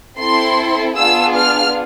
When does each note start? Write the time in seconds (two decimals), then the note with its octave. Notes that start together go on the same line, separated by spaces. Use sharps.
0.18 C4 E4 A4 C6
0.96 B3 D4 F4 G#4 E6
1.35 F6